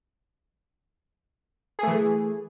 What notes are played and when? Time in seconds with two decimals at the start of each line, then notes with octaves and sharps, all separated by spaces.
1.79 G#4
1.83 A3
1.88 E3